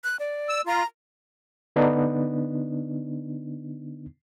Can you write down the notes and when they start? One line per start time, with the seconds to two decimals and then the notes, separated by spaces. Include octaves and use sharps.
0.04 F#6
0.20 D5
0.49 E6
0.67 F4 A#5
1.76 D3 B3 D4 D#4